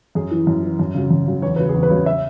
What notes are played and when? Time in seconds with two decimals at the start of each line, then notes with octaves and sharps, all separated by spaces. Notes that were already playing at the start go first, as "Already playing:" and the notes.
0.15 F#2 G#4
0.31 E3
0.47 F#2
0.63 E3
0.79 F#2
0.94 C#3 F#3
1.11 F#2
1.27 C#3 F#3
1.42 E2 C#5
1.56 C#3 F#3 B4
1.69 E2 G#4
1.83 B4
1.90 C#3 F#3
2.06 E5